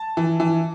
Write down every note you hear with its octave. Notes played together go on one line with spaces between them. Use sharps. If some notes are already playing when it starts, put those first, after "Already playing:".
Already playing: A5
E3
E3